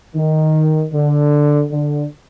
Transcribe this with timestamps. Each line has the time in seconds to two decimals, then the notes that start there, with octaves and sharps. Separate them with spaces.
0.14 D#3
0.92 D3
1.71 D3